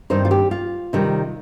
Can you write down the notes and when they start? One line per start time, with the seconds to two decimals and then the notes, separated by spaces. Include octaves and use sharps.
0.10 G2 D#3 C4 D#4 C5
0.25 F4
0.31 G4
0.51 F4
0.93 C3 D#3 G3